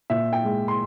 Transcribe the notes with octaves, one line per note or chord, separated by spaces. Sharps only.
A#2 E5
G5
G#3
C6